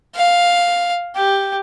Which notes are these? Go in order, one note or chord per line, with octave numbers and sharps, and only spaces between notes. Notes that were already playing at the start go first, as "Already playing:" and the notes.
F5
G4